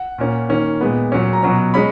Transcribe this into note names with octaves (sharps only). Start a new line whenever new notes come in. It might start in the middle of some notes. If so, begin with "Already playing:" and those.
Already playing: F#5
A#2 A#3 C#4
D#3 A#3 C#4
A#2 G#3 B3
A#2 F#3 C#4
A#5
B2 F#3 C#4
G#3 C#4 B5